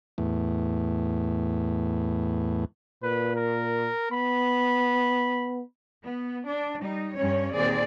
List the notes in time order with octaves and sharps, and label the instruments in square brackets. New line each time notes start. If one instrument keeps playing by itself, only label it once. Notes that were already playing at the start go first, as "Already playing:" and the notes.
[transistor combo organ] E2 A2
[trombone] A#2 [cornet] B4
[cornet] A#4
[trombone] B3 [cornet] B5
[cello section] B3
D4
G3 D#4
G2 G3 C#4 C#5
D#2 A#2 C4 G#4 D5